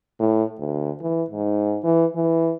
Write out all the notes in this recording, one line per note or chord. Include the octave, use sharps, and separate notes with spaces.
A2
D2
E3
G#2
E3
E3